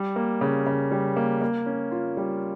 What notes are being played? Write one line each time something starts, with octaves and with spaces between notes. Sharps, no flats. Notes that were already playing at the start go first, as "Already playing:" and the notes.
Already playing: G3
A#3
C#3
C#3
G3
A#3
A#3
C#4
F4
G3